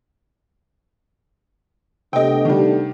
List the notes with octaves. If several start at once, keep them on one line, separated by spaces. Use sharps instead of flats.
C3 A3 B3 D4 G4 D#5 G5
D#3 G3